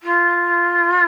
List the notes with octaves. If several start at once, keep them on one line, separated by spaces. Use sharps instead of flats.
F4